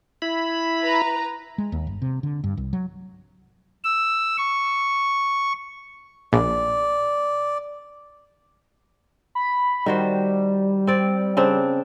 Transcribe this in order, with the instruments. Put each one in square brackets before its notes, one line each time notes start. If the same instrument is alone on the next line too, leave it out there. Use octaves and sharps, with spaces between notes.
[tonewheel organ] E4 B5
[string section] B4 A#5
[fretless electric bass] G#3
D#2
G1
C3
D3
G2
C2
F#3
[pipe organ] E6
C#6
[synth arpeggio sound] A#1 [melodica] D5
[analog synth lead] B5
[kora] D#3 F#4 C5 [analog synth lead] G3
[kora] C4 D5
C#3 C4 D4